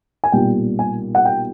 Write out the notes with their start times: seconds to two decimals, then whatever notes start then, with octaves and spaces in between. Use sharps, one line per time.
0.24 G#5
0.32 B1 A#2 G3 G5
0.79 G#5
1.15 F#5
1.25 G5